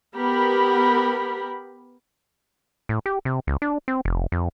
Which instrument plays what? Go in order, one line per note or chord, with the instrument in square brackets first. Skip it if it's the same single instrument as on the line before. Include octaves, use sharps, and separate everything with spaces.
[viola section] B3 G4 A#4 B5
[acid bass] A2
G4
C3
C#2
D4
C4
F1
F2